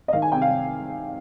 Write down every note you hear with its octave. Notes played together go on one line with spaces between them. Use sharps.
D#5
D#3 F5
G#5
C3 G5
F5